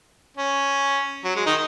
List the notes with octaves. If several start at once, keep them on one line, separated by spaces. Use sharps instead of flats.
C#4
F#3
G#3
D#3 D#4